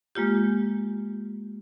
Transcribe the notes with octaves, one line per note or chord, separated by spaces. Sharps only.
G#3 A#3 F4 G4